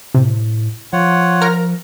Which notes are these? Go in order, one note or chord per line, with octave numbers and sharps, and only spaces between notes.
A2 C3
F3 F4 C#5 F#5
A#4 A#5 F6